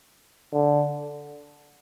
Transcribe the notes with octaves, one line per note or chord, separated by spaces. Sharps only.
D3